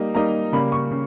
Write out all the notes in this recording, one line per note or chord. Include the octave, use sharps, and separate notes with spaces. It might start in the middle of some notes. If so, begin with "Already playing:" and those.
Already playing: G3 A#3 D#4
G3 A#3 D#4 A#5
C#3 G3 A#3 B5
C#6
C#3